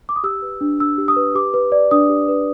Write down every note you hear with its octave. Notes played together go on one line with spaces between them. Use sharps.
D6
D#6
G4 E6
B4
D4
D4 E6
G4
D#6
B4
G4 D6
B4
D5
D4 D#6
G4
B4